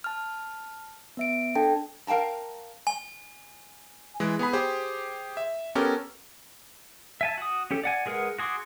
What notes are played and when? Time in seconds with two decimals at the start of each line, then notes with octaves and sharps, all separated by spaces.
0.04 A5 F6
1.17 B3 E5 D7
1.56 D4 A4 G5 A5
2.07 A#4 F5 G5 A5 A#5
2.87 G#5
4.20 E3 G#3
4.39 B3 G#4 B5
4.53 G4 G#4 C5
5.37 E5
5.75 B3 C#4 G4 A4 A#4
7.21 E5 G#5 A5
7.38 F#4 D#6
7.71 C#4 G4 A4
7.84 D5 F#5 G#5
8.06 G#3 G#4 A#4 B4 F#5
8.39 F#4 G#4 C6 D6